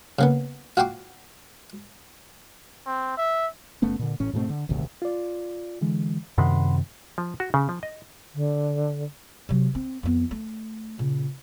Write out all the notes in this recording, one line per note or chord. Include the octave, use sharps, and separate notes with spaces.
C#3 A#3 B3
F4 F#4 G5 C6 D6
C4
E5
F#1 A3 B3 C#4
A#2 D3
A1 A2 C#4
G#2 B2 A3 C4
D3
D#1 G#1 D2 C3
F4 D5
D3 E3 G#3
F#2 C3 D#3 F#5 B5 C6
F3
F#4
C#3
F3
D#5
D3
C3 F#3
C4
F2 B3
A3
A#2 C#3